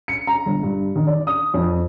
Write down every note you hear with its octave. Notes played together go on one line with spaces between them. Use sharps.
C#7
A#5
G1
G2
D#3
D5
D#6
F2